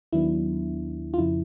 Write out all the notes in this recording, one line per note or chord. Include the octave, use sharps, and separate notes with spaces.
D#2 D#3 F#3 B3 D4 E4
F4
F2 C#3 F3 E4